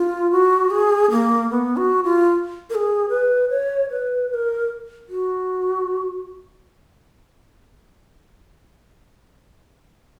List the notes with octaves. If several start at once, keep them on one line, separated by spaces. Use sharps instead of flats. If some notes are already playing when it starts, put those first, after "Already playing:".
Already playing: F4
F#4
G#4
A#3
B3
F#4
F4
A#4
G#4
B4
C#5
B4
B4
A#4
F#4